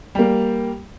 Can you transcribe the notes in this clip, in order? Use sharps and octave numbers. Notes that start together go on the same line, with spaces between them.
G3 A#3